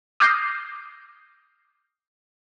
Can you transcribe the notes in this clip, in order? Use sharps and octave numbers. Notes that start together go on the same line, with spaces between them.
D6 D#6 F6 G6 A#6 C7